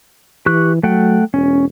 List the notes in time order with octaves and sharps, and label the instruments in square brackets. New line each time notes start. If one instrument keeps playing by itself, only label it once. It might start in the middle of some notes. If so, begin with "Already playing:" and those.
[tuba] E3 [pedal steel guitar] G4 C#6 F#6
[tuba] F#3 [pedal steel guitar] A3 F#5 G5
[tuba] E1 [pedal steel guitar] C#4